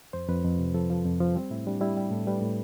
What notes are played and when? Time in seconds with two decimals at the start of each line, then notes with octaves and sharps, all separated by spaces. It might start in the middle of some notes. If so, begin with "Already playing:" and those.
0.13 F2 C5
0.28 F2 B4
0.45 F2
0.59 C3
0.74 F3 A4
0.90 F3
1.05 F2
1.21 F3
1.35 G3 C4
1.51 A2 E4
1.67 G3 D4
1.81 G3 E4
1.97 G3 G4
2.11 A2 A4
2.27 G3 B4
2.42 A2